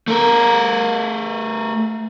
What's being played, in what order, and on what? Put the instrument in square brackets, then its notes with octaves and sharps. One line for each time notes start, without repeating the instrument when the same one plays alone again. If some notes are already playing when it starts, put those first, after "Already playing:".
[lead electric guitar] A3 A#4